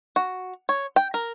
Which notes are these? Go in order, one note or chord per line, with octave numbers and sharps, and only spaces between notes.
F#4
C#5
G5
A#4